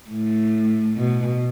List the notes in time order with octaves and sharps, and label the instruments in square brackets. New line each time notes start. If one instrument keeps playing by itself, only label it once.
[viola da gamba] A2
B2